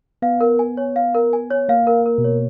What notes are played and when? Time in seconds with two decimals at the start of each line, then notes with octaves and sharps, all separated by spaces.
0.22 B3 F5
0.41 A#4
0.59 G#5
0.77 C#5
0.96 F5
1.15 A#4
1.33 G#5
1.51 C#5
1.69 A#3 F5
1.87 A#4
2.06 A#4
2.18 B2
2.24 C#5